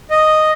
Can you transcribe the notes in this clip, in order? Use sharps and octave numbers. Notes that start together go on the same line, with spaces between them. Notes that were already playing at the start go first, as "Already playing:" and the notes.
D#5